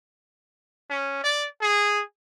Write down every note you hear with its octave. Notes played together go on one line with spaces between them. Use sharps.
C#4
D5
G#4